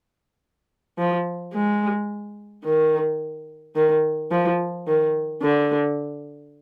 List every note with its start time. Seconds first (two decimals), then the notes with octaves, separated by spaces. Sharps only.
0.98 F3
1.54 G#3
2.64 D#3
3.75 D#3
4.31 F3
4.87 D#3
5.42 D3